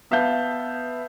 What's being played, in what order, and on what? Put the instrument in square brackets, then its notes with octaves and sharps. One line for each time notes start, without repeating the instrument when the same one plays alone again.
[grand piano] B3 E5 F5 A5 G6